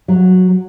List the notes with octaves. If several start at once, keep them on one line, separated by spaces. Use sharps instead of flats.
F#3